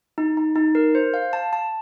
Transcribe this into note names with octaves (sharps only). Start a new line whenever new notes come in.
D#4
D#4
D#4
A#4
C5
F5
A5
A5